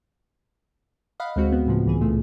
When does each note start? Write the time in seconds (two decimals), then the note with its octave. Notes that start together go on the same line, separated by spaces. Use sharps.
1.20 D#5 F5 F#5 B5
1.36 D2 G#3 C4 F#4
1.52 B3
1.67 A2 C#3 F3
1.86 C#2 E3 G#4
2.01 C#2 A#2 F3 A3